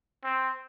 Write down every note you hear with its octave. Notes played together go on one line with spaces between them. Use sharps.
C4